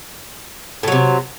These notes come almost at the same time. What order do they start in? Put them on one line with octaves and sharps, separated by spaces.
A2 F#3 C3